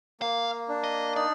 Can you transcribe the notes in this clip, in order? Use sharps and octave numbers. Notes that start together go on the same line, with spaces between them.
A#3 F5
D4
D#5
D#4 D5